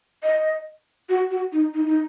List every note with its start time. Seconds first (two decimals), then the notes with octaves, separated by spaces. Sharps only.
0.23 D#5
1.09 F#4
1.31 F#4
1.52 D#4
1.74 D#4
1.86 D#4